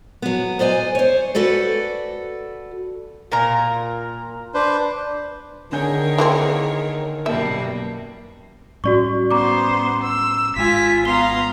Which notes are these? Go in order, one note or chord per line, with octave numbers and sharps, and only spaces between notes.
F#3 B3
C5 D5 D#5 G#5
C5 C#5
F#4 A4 B4 D5
A#2 A#4 A#5
D4 B4 C5
D3 D#3 G#4 A#4 C#5 G#5 G6
E3 A#3 C4
F#2 B2 G3 A#3 E5 A5
A2 G3 C#4 F#4 D5 C#6
B3 C5 A#5 D6
E6
G#1 G#3 F4 G#5 B6
B3 F5 A#5 C6 G7